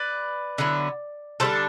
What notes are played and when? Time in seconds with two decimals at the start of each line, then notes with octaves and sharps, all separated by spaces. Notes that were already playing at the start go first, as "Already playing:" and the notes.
Already playing: B4 D5
0.58 D3 F#3 B3 E4
1.40 D3 G3 D4 A4 C5